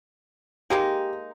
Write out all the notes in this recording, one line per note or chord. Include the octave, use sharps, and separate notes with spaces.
G#3 A#3 D#4 G4